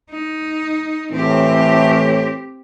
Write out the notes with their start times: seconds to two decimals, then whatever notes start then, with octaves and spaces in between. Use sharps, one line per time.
0.11 D#4
1.13 A2 E3 C4 G4